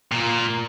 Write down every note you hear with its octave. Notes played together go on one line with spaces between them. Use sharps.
A#2